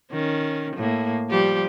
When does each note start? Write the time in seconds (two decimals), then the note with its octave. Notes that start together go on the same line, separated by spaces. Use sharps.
0.12 D#3 C#4
0.77 A2 A#3
1.29 F3 G3 G4